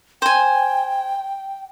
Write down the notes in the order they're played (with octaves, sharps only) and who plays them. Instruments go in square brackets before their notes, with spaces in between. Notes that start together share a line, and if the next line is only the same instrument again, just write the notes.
[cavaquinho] C5 G#5 [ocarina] G5